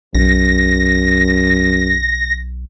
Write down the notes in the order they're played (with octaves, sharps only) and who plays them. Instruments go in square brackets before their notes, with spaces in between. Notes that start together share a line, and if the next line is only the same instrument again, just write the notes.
[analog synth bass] B1 [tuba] F#2 [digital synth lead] A#6